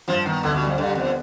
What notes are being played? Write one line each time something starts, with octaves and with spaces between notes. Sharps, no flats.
G2 F3
D#3 B3
D2 D3
B2
G3
F2
G2 D3
F2 B3